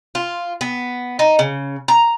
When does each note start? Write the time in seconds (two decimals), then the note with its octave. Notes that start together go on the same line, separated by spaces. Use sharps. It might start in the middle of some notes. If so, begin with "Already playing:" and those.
0.15 F4
0.61 B3
1.19 D#4
1.39 C#3
1.88 A#5